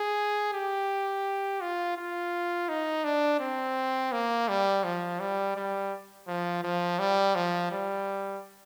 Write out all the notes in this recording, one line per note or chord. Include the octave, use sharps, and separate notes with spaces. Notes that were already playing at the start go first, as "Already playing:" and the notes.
Already playing: G#4
G4
F4
F4
D#4
D4
C4
A#3
G3
F3
G3
G3
F3
F3
G3
F3
G3